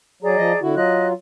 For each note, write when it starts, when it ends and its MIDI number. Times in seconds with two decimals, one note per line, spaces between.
0.23 0.36 54
0.23 0.58 68
0.23 0.58 74
0.23 0.58 82
0.36 0.52 53
0.36 0.52 75
0.62 0.75 50
0.62 0.75 64
0.62 0.75 66
0.75 1.13 54
0.75 1.13 65
0.75 1.07 75
0.75 1.07 90